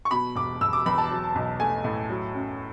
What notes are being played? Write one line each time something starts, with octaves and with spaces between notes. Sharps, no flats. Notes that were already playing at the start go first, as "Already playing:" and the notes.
C#6
B2 B5
E1 D6
E1 E6
D6
E2 B5
A5
F#3
B1
A3 G#5
A2
F#3
F#2